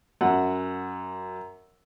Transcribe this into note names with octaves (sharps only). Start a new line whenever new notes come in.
F#2 F#5